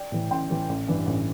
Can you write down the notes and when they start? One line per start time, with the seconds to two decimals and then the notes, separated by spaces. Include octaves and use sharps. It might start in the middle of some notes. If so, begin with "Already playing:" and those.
Already playing: D5 G5
0.12 A2 E3
0.31 A1 G5 C6
0.50 A2 E3
0.69 A1
0.88 G2 E3
1.07 A1